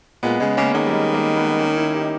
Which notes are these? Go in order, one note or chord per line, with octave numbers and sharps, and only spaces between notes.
A#2 G#3 B3
C#3 G#3
C#3 A#3 C#4
D#3 G#3
G3
G#3
G3 A#3
G#3 B3
A#3 C#4
C#4 E4
D#4 G4